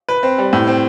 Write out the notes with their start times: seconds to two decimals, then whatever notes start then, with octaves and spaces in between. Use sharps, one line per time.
0.09 B4
0.23 C4
0.38 G3
0.53 A2
0.67 C4